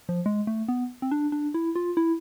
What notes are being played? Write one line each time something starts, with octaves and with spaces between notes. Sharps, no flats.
F3
G#3
A3
B3
C4
D4
D4
E4
F4
E4